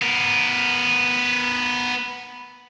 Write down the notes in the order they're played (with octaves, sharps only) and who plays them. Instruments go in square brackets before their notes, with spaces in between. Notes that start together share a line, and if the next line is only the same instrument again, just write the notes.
[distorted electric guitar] B3 A#4